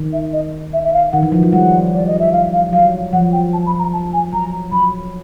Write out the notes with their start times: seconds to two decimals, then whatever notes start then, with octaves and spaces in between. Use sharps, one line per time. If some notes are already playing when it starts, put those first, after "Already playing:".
Already playing: D#3
0.13 E5
0.33 D#5
0.73 E5
0.84 E5
0.93 F5
1.12 D#3 F#5
1.22 E3
1.32 F3
1.43 F#3
1.53 G3 F#5
1.94 D5
2.07 D#5
2.19 E5
2.32 F5
2.53 F5
2.73 F#3 F5
3.13 F3 F#5
3.32 G5
3.53 A5
3.66 B5
3.79 A#5
3.93 A5
4.13 G#5
4.33 F#3 A#5
4.72 F#3 B5